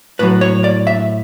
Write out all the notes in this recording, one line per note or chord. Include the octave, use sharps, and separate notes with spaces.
A2 F#3 B4
C#5
D5
E5